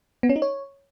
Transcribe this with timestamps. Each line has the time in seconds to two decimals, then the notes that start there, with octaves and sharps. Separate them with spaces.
0.23 B3
0.29 C#4
0.36 D#4
0.42 C#5